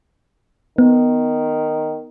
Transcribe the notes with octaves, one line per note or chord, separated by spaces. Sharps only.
D#3 B3